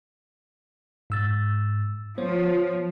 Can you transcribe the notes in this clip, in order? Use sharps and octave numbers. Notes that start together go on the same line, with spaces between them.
G#2 E6 A6
F3 B3 C5 C#5